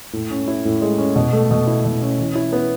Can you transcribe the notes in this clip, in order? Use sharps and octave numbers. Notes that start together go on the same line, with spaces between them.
A2
C#4
E4
A2
G#3
C#4
B2
A3
B2
E4
B2
C#4
E3
E4
B3